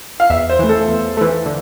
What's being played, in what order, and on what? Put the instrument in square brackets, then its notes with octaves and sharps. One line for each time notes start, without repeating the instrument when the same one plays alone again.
[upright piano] F5
[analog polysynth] E2 [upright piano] E5
[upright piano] C5
[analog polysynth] E3 A3
[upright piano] A4
[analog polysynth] E2
E3 A3
D3